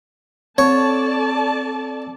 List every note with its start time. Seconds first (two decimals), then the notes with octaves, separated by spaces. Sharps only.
0.58 C4 A4 C#5 D5 A5